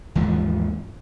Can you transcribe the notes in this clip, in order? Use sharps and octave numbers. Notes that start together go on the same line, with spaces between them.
D#2 G#2 E3 F3